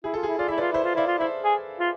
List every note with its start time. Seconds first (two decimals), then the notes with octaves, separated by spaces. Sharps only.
0.04 E4 G#4
0.14 F4 A4
0.23 E4 G#4
0.38 F4 D5
0.48 E4 E5
0.58 F4 B4 D5
0.72 E4 C5 E5
0.84 F4
0.95 E4 D5 F5
1.07 F4
1.18 E4 C5 E5
1.44 G#4
1.79 F4